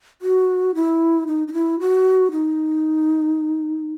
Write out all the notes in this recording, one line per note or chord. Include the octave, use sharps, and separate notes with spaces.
F#4
E4
D#4
D#4
E4
F#4
D#4